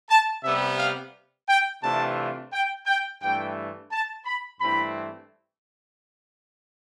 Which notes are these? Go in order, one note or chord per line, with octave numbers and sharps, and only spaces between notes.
A5
C3 G3 B3 E5
F5
G5
C3 E3 A3 D4 F4 A5
G5
G5
G2 E3 A3 G5
A5
B5
G2 E3 A3 C4 E4 B5